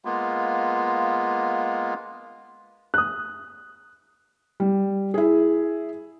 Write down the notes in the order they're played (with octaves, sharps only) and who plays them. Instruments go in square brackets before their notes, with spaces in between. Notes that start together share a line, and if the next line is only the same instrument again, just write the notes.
[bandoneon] G#3 A#3 B3 F4
[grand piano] D#6 F#6
[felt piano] G3
E4 G#4